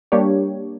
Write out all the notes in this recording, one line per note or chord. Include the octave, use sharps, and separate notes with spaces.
G3 A#3 D4 G4 C#5